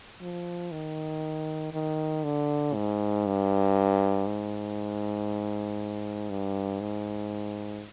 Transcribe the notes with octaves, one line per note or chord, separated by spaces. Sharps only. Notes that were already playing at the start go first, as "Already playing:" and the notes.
F3
D#3
D#3
D3
G#2
G2
G#2
G2
G#2